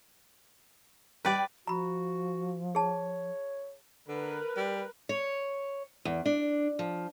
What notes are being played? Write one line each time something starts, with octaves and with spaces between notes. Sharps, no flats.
G3 B4 D5 G5
F3 F#4 A#5 B5
G#4 C#5 A5
D3 A#4 B4
G3
C#5
E2
D4
F3